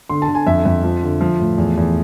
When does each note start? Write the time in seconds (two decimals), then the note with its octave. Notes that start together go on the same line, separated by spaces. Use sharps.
0.10 D3 C6
0.22 A5
0.28 D3
0.35 G#5
0.47 F2 E5
0.65 F2
0.84 F3
1.03 D3
1.21 F3
1.40 A2
1.58 E2
1.77 E2